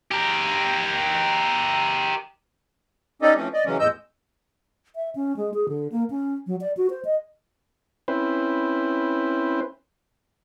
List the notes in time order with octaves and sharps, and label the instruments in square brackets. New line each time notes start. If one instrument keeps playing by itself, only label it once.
[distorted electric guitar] G4 A#4
[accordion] C#4 D#4 G4 A4 D5 D#5
E3 F3 A3 C4 C#4
D5 D#5
C#3 E3 F#3 G#3 C#4
E2 A2 G#3 D#5 E6 G6
[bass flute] E5
C#4
G#3
G#4
D3
A#3
C#4
F#3
D5
F#4
C5
D#5
[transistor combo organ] C4 C#4 E4 B4 C5